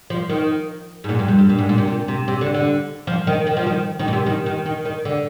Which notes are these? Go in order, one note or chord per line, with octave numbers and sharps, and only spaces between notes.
F3
D#3
G#2
A#2
G2
F2
G2
A#2
G#2
A#2
C3
A#2
C3
C3
D3
D3
F3
D#3
D#3
F3
D#3
D#3
A#2
C3
D#3
D#3
D#3
D#3
D3